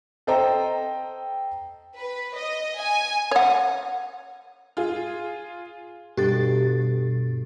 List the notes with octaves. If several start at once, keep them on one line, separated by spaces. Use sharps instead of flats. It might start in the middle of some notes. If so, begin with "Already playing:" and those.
A4 C5 D#5 G5 A#5
B4
D#5
G#5
C#5 F#5
F4 G#4
G2 B2 G4 A4 A6